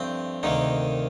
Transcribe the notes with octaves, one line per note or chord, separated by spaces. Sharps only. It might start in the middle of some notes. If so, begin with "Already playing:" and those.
Already playing: G2 F3 A3 C4
D2 C3 D#3 A#3 D#4